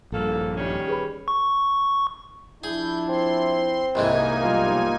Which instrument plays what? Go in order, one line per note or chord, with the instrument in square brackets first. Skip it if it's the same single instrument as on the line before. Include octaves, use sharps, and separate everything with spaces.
[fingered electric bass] A#1 G2 [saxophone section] A#3 A4
[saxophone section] D#3 G3 C#4
[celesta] G#4 B4 B5
[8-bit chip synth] C#6
[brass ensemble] F3 D4 E4 [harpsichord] G#4 [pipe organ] G6
[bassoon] C4 [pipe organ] C6
[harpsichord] C2 G#2 E3 [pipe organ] A#3 D#4 G#5
[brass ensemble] B1 F3 G3 [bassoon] F4